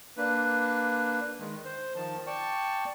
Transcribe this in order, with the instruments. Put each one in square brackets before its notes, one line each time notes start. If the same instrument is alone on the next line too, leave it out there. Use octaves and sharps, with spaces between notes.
[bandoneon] A#3 D4 B4
D#3 G#3
C5
D#3 F3 A5
D5 G5 A5 C#6